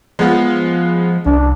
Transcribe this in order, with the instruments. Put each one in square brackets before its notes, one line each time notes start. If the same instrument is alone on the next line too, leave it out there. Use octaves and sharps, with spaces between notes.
[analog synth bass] F3 [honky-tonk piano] G#3 B3 F4
[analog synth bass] C2 [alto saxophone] D4